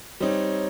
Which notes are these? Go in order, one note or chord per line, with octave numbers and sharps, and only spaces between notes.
G3 C4 D#4 C#5